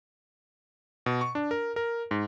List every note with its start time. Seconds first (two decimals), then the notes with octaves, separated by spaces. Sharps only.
1.06 B2
1.21 C#6
1.35 D4
1.51 A#4
1.76 A#4
2.11 G#2